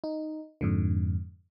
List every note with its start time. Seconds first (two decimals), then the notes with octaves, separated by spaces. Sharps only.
0.04 D#4
0.61 F2 G#2 D3